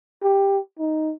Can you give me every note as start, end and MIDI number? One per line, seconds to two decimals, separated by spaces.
0.22 0.59 67
0.79 1.13 63